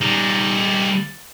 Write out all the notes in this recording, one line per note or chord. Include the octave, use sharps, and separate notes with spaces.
G3 D#4